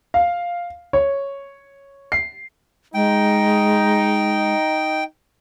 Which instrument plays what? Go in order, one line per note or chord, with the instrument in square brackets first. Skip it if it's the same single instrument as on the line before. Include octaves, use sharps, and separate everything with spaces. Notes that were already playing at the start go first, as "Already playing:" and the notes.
[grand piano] F5
C#5
C7
[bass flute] G#3 [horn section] D#4 [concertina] G5